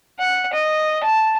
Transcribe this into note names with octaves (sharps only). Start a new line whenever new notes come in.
F#5
D#5
A5